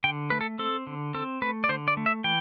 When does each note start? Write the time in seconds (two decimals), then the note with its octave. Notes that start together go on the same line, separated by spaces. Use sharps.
0.04 D3 G5
0.30 A3 B4
0.41 A4
0.59 C4 A4
0.87 D3
1.14 C4 A4
1.42 A3 B4
1.64 D5
1.69 D3 C5
1.88 D5
1.97 A3
2.06 E5
2.24 E3 G5